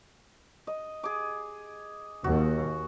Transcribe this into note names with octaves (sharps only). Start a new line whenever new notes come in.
D#5
G#4 D6
D#2 F#4